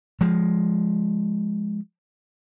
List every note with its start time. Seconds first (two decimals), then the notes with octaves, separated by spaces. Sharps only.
0.21 F3 G#3